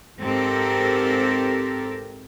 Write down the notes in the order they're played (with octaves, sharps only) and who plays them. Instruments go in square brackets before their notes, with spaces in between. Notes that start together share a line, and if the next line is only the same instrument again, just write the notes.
[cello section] G#2 C4 G4 A4 A#4